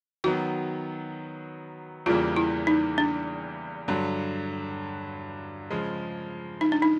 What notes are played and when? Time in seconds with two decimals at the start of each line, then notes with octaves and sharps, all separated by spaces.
0.24 D#3 F#3 B3 F#4
2.06 E2 C#3 E3 G3 A#3 F4
2.36 E4
2.67 D#4
2.98 D4
3.88 G2 D3 F#3
5.70 C#3 F3 G#3
6.61 D#4
6.72 D4
6.82 D#4